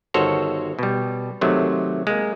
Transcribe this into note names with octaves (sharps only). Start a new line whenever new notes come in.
G1 D#3 F#4 A4 C5 C#5
B2 G3
C3 D#3 F#3 A3
G#3 A#3